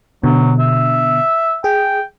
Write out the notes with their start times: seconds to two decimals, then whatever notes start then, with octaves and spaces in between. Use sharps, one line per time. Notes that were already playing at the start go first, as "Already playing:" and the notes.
0.24 B2 D3 F#3
0.59 E5
1.64 G#4 G5